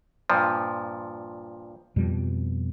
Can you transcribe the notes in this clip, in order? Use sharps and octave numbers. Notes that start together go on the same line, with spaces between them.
G2 A#2 F3
F2 B2 G3